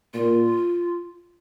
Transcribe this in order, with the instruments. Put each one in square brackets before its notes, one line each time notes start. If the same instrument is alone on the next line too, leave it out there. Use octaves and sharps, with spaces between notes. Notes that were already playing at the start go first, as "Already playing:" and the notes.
[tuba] A#2 [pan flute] F4